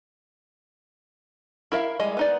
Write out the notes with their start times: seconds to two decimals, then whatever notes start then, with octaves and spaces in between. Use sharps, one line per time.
1.72 E4 A#4 E5 F5
2.00 G3 G#3 D#5
2.17 B3 D#4 D5